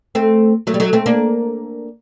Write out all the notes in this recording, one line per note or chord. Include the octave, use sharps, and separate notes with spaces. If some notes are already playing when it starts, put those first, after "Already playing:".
A3 C4
F#3 A3
G3
F#3 A3
A3 C4
A#3 D4